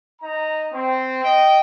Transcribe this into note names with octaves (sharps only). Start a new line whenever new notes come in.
D#4 A#5
C4
D#5 G5